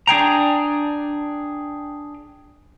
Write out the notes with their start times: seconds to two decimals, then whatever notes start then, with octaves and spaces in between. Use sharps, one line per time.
0.07 D4 G#4 G5 A#5